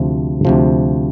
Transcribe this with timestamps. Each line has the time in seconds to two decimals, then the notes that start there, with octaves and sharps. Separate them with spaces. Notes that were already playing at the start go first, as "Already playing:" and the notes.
Already playing: D2 C3 F3
0.45 D2 C3 F3